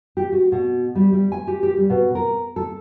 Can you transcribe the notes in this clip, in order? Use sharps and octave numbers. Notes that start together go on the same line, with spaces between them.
G4
F#4
B2
G3
G3
G#5
G4
G4
G3
B2
A#4
A4